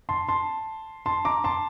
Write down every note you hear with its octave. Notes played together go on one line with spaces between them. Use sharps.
A5 C6
A5 C6
A5 C6
A#5 D6
A5 C6